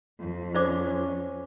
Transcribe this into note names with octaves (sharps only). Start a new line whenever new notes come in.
F2
C#4 C5 D5 D6